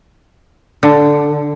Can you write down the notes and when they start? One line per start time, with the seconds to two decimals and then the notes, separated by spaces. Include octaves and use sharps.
0.83 D3